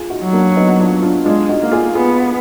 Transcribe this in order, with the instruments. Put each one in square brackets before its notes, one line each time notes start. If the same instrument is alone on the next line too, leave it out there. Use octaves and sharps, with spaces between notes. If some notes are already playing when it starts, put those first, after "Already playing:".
Already playing: [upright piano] F4 G#4
D#4 F#4
[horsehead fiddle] F#3
[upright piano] A#3 D4
B3 D#4
D4 F4
D4 F4
[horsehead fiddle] G#3 [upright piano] D4 F4
[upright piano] D#4 F#4
[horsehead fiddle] A#3
[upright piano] F4 G#4
[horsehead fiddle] B3 [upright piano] F4 G#4